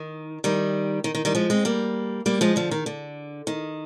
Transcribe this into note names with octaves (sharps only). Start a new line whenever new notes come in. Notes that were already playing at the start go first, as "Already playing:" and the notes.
Already playing: D#3
D#3 G3
D#3
D#3
D#3 G3
F3 G#3
G#3 C4
G3 A#3
G3 A#3
F3 G#3
D3 F3
D#3
D3
D#3